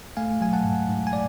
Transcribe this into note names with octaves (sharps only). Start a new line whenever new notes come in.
A3 F5 G#5
F#3 G#5
F#5 A5
G#2
G#2
G#5
D5